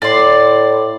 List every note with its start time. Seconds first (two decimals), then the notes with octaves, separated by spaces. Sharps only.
0.02 A2 D5 C6